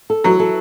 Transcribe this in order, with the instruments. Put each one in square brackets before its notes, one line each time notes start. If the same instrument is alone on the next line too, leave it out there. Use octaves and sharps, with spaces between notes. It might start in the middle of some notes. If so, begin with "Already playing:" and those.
[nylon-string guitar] A4
[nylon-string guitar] E3 [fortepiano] F#3
[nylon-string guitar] A4